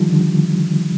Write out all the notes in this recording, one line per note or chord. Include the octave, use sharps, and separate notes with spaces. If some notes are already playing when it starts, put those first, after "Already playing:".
Already playing: D#3 F3 G3
D3